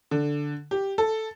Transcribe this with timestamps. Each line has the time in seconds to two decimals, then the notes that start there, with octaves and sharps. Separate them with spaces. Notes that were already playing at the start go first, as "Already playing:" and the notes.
0.11 D3
0.71 G4
0.98 A4